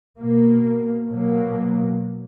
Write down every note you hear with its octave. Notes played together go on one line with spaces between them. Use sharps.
B2 A#3
B2 F#3 A#3